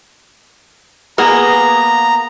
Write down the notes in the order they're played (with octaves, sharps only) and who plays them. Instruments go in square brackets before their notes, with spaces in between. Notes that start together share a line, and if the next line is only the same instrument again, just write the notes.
[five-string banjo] A#3 B3 G#4 [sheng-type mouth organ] A#5